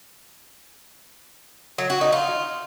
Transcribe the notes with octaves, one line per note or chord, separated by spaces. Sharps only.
F#3
F#4
D#4
F4